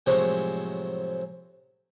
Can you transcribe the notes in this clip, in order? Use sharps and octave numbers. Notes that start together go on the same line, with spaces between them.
A2 C3 F3 F#3 G#3